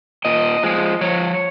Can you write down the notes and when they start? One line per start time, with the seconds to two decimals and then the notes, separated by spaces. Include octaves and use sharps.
0.25 A#2 D#5
0.63 F3 G#3
1.01 F3 C#5